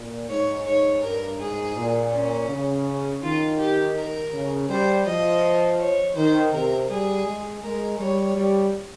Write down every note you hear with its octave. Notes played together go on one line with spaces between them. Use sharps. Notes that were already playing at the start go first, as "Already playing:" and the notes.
Already playing: A#2
G#2 C#5
G#2 C#5
G2 A#4
G#2 G#4
A#2
C#4
C#3
C#4
D#3 F4
G4
A#4
C#3
G3 C5
F3 D#5
C#5
D#3 C5
C3 A#4
G3 G#4
G#3
G#3 A#4
G3 C#5
G3